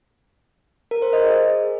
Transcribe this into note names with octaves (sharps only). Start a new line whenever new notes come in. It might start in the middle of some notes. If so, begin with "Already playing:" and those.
A#4
C5
D#5
G#4